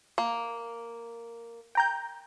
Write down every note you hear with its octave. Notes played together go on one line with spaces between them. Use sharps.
A#3
G5 A#5 G6